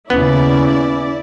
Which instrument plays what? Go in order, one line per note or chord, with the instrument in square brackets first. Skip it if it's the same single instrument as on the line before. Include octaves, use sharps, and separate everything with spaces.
[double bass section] D#2 C#3 [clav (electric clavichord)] B3 [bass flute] C#4 [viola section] E4 D5